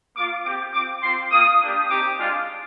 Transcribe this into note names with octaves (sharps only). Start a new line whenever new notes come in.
A#3 F4 D6
C4 G4 D6
C4 F4 D6
C4 F4 C6
A#3 F4 D#6
A#3 D4 G4
C4 D#4 G4 D6
G#3 D4 F4